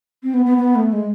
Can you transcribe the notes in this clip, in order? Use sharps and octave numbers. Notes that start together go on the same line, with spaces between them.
C4
B3
B3
B3
A3
G#3